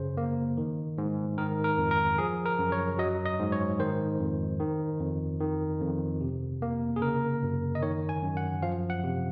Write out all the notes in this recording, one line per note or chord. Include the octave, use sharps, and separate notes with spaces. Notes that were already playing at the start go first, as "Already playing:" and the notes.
Already playing: F#2 C#3 C5
A#3
D#3
G#2
D#3 A#4
A#4
F2
A#4
F3 G#4
A#4
F#2
C#5
F#3 D#5
D#5
G#2
C#5
D#3 C5
F2
D#3
F2
D#3
F2
C3
A#3
G#4
C#3 A#4
F#2
D#5
D#3 C#5
G#5
F#2
F#5
F3 F5
F#5
C3